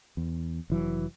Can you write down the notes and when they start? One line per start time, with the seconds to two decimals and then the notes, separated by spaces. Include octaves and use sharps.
0.17 E2
0.70 F1 E3 F#3